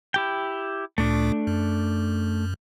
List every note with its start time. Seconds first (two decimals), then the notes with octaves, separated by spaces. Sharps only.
0.14 E4 G4 G5
0.98 D2 A#2 A3 D4
1.47 F#2